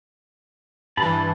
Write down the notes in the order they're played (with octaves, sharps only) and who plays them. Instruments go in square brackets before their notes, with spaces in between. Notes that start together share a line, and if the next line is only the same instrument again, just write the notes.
[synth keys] G2 E3 [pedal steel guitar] A5 B5